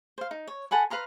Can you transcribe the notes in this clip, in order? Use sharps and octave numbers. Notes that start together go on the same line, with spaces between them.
C5 F5
D#4
C#5
A4 F#5 G#5 B5
B4 F5 A#5 C6